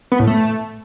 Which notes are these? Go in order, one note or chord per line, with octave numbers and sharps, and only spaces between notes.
B3
A2
A3